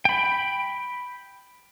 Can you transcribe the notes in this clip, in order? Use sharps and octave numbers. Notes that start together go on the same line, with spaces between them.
G5 B5